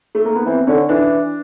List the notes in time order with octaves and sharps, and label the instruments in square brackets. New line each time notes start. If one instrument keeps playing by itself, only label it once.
[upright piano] A3
A#3
B3
[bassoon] E3 [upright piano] C4
[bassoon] D3 [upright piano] C#4
[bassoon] E3 [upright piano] D4